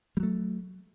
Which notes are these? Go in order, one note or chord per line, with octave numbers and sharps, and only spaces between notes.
F#3 G3 A3